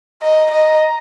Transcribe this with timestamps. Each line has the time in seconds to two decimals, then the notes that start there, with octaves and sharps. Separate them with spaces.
0.22 D#5 A#5
0.51 D#5